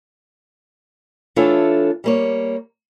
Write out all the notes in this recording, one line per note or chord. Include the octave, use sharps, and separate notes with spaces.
E3 A3 D4 F4 A4 C#5
G3 A#3 C#5